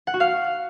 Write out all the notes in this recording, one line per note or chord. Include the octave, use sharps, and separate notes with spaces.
F#5
F#4
F5